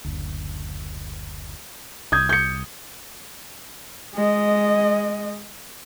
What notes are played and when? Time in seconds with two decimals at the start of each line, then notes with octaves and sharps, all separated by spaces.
0.04 F#1 D2
2.12 C2 D#6 G6 G#6
2.29 G6 C#7
4.14 G#3 D#5